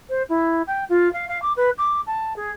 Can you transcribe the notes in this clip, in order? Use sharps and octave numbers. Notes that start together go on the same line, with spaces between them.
C5
E4
G5
F4
F5
F5
D6
B4
D6
A5
G#4